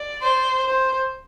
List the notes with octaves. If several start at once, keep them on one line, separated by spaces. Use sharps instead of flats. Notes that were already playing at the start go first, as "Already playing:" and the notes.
Already playing: D5
C5
C5